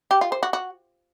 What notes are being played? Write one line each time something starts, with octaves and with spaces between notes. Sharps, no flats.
G4
F4
C5
F#4
F#4